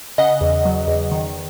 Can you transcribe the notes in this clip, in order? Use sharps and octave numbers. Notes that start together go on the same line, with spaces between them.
C#3 D#5 F#5
E2
F#3
E2
D#3